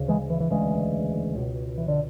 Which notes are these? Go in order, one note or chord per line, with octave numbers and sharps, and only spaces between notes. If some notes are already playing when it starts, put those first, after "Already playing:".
Already playing: D2 C#3
E3 G#3
E3
E3
E1 D2 C#3 E3 G#3
C#2 B2
E3
D3